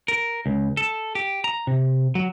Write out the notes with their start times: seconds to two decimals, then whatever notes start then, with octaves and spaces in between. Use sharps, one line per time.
0.08 A#4
0.46 C#2
0.77 A4
1.15 G4
1.44 A#5
1.67 C3
2.15 F#3